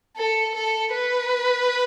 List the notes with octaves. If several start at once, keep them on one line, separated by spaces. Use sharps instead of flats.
A4
A4
B4